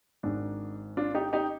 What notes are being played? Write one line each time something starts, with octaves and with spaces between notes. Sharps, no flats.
G#1 G#2 D#3 D4
D4 F4
D#4 G4
D#4 G4